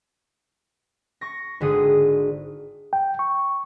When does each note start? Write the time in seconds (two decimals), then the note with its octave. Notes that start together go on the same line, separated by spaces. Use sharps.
1.21 C#6 A#6
1.60 G#1 D3 G#4 D#6
2.93 G5
3.19 C#6